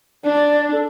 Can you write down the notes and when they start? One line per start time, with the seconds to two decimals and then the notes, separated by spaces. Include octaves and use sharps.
0.24 D4 D5
0.72 A4